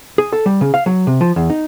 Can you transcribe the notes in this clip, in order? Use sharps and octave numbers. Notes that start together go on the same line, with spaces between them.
G#4
A4
G3
C#3
F5
F#3
C3
F3
E2
D#4